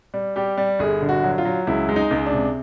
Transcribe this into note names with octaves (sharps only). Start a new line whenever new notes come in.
G3
G3 G4
G3
G1 G#4
D3
F#4
F#3
F4
F#3
C#2 E4
G#3
D#4
C#2
D4
C3